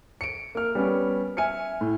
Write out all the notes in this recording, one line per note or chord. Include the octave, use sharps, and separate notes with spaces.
C#7 D7
A#3 F6
G3 B3 C#4
E5 G#5 F6 C#7
A2